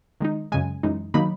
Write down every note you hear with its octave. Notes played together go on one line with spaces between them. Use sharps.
D#3 G#3 D#4
F#2 C#3 G#3 G#5
F#2 E3 G#3 D#4
D#3 F#3 A#3 D#4 B5